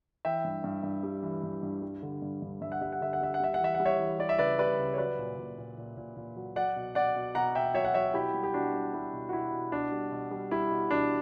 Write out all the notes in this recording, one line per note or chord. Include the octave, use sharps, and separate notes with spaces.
E3 E5 G5
G2
G2
G2
G3
E3
G2
G2
G3
D3
G2
G2
G2 E5
F#5
G3 E5
F#5
D3 E5
F#5
G3 E5
F#5
G3 E5
F#5
E3 E5
F#5
G3
C#5 E5
E3
G3 D5
E5
C#3 B4 D5
G3 B4 D5
C#3
C#5
F#3 B4 D5
A#2
A#2
A#2
A#2
A#2
A#2
F#3
F#3 D5 F#5
B2
B2 D5 F#5
B2
B2 F#5 A#5
B2 E5 G5
F#3 C#5 E5
F#5
F#3 C#5 E5
B2 E4 G4
G3
G4
B2 D4 F#4
G3
G3 E4
B2
F#4
B2 E4
B2
B2 D4
G3
B2
G3
G3 E4
B2
B2 D4